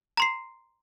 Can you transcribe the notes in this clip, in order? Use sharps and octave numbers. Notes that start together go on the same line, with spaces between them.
A#5 C6 C7